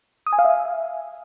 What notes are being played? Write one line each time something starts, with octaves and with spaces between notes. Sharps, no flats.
D#6
G#5
F5
E5